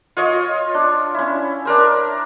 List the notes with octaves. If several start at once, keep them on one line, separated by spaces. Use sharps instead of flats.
F4 C#5 D#5
D4
C#4 E4
D4 A#4 C5